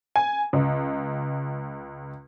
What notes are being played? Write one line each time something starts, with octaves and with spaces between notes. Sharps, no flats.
G#5
C#2